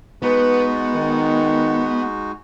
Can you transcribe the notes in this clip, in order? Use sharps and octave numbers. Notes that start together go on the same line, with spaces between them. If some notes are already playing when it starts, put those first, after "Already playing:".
G#3 B3 D#4 F#4 B4
D#3